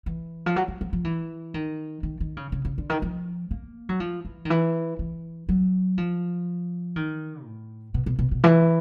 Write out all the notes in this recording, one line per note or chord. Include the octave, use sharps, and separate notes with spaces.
E3
F3
F#3
F3
F3
F3
E3
D#3
D#3
D#3
C#3
C#3
C#3
D3
D#3
F3
A#3
F#3
F3
E3
D#3
E3
E3
F#3
F3
D#3
A2
B2
B2
B2
B2
E3